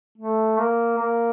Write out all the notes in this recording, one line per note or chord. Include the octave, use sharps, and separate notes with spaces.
A3
A#3
A#3